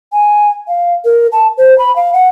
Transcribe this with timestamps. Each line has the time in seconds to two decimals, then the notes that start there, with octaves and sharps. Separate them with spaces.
0.13 G#5
0.68 F5
1.05 A#4
1.32 A5
1.58 C5
1.78 B5
1.96 F5
2.13 F#5